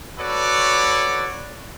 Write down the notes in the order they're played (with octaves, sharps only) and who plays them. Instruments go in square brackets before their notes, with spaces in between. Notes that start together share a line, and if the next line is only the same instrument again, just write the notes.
[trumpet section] F#4 A4 B4 C#5 D5